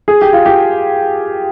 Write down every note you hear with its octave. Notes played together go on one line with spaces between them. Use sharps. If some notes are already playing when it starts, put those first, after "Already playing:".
G#4
G4
F4
G4